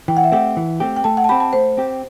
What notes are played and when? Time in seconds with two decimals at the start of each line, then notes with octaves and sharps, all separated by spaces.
0.08 E3 G5
0.17 F#5
0.24 E5
0.32 A3 C4 G4 F#5
0.57 E3
0.80 A3 C4 G4
0.96 G5
1.04 A3 A5
1.17 F#5
1.24 A5
1.29 C4 G4 B5
1.40 A5
1.53 A3 C5
1.77 C4 G4